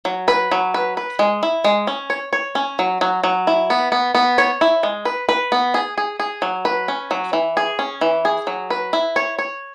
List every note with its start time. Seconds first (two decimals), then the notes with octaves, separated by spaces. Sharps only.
0.05 F#3
0.28 B4
0.51 F#3
0.74 B4
0.97 B4
1.19 G#3
1.43 E4
1.64 G#3
1.87 C#4
2.10 C#5
2.33 C#5
2.55 C#4
2.79 F#3
3.01 F#3
3.24 F#3
3.47 E4
3.70 B3
3.92 B3
4.15 B3
4.38 C#5
4.61 E4
4.83 G#3
5.05 B4
5.29 B4
5.52 B3
5.74 G#4
5.98 G#4
6.20 G#4
6.42 F#3
6.65 B4
6.88 C#4
7.11 F#3
7.33 E3
7.57 G#4
7.79 C#4
8.01 E3
8.25 G#4
8.47 F#3
8.70 B4
8.93 E4
9.16 C#5
9.39 C#5